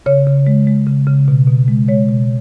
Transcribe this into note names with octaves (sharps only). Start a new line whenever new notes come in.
C#3 C#5
C#3
G#3
G#3
C#3
C#3
B2
B2
G#3
G#3 C#5
B2